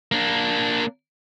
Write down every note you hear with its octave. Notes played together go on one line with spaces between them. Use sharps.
A#3 D4